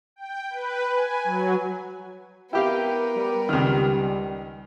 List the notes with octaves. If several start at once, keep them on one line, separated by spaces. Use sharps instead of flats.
G5
B4
G#5
F#3
B3 E4 G4 A#4 F5 G5
G3
C#2 D#3